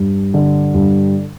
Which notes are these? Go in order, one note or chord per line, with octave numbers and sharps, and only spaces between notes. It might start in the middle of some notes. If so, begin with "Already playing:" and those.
Already playing: G2
D3
G2